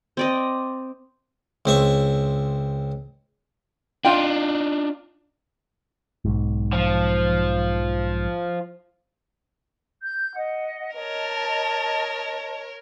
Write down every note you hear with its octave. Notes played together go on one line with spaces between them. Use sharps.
C4 D5 D#5
C#2 C4 E5 C#6
D4 D#4 F4 G5
B1 G#2
F3
G6
D#5 F#5
A#4 C#5 D#5 A5